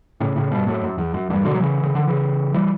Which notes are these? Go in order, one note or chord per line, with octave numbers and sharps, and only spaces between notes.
A2 C#3
A2 C#3
G2 B2
F#2 A2
F#2
E2
F#2
E2 G2
B2 D3
F#3
C#3 E3
C#3
D3
C#3 E3
E3 G3